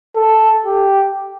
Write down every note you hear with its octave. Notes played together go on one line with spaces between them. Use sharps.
A4
G4